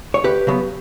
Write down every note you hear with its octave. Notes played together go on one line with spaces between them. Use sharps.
C#5
D2 G4 B4
C#3 F#3 B3